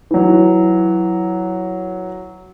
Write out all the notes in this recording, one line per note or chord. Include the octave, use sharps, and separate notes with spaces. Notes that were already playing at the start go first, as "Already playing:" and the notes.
E3 F#3